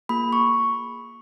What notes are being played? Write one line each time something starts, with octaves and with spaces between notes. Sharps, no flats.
A#3 F4 G#4 B5
C#6